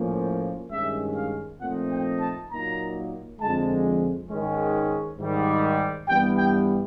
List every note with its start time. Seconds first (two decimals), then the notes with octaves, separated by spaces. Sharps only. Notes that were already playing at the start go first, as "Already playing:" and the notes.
Already playing: A2 F3 A#3 C#4
0.71 G2 D#3 G#3 C#4 E5
1.16 F5
1.61 A#2 F3 A3 C4 D#4 F#5
1.91 G5
2.20 A5
2.51 A#2 F#3 A#3 D#4 A#5
3.40 F2 D3 F3 G#3 A5
4.29 G#2 D#3 G#3 C#4
5.19 G#2 D#3 G3
6.08 G2 E3 G3 B3 G5
6.38 G5